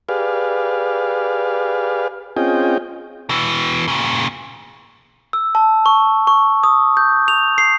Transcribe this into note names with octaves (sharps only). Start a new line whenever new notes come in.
G4 G#4 B4 D5 F5
C4 C#4 F4 G#4 D#5 G5
B2 E3
A#2 C#3
E6
A5
C#6
C#6
D#6
G6
F7
C7